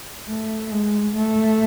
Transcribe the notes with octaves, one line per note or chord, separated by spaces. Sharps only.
A3
G#3
A3